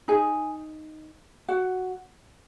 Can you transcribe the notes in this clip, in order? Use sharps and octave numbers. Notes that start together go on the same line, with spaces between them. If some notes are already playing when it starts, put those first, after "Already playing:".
D#4 G#4 G#5
F#4 F#5